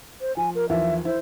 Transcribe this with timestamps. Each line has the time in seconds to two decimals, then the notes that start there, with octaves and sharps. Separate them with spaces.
0.21 C5
0.37 F3 G#5
0.55 A#4
0.69 D#2 E3 F3 E5
1.05 E4 C5